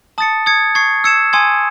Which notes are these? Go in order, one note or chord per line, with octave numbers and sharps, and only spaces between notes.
A5 D#6 A6 C#7
D#6 G#6 C#7
C#6 G#6 C7
E6 G#6 C#7 E7
G#5 C6 D#6 G#6